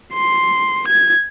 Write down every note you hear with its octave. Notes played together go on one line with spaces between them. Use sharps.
C6
G#6